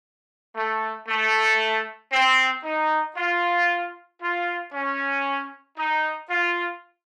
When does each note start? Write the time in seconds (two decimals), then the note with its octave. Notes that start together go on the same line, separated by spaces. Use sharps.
0.56 A3
1.08 A3
2.13 C4
2.64 D#4
3.17 F4
4.22 F4
4.73 C#4
5.77 D#4
6.30 F4